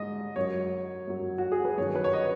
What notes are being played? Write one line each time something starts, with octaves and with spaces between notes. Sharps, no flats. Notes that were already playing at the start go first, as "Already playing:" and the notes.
Already playing: G#2 G#3 D#5
F#2 F#3 C#5
F#2 F#3
F#4
G#4
B4
F#2 D#3 F#3 C#5
B4
C#5
D#5